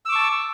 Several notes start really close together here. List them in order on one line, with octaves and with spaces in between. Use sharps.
E6 D6 C#6 A5